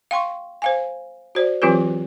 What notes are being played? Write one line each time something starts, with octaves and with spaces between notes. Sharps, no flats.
F5 G5 C6 C#6
C5 F5 G#5
F#4 C5 D5
E3 F#3 C4 F4 G4 B4